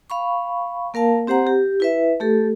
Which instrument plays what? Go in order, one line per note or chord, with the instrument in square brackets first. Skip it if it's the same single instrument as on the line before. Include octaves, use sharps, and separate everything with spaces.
[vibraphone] F5 B5 C#6
A#3 A#4 F5 A5
C4 G4 C5 F#5 A#5
G4
E4 B4 E5
A3 G4 A4